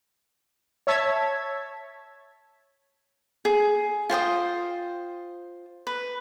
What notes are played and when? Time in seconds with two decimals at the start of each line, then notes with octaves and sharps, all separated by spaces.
0.87 C#5 E5 A5 G#6 B6
3.45 G#4
4.10 F4 C5 G5 D#6
5.87 B4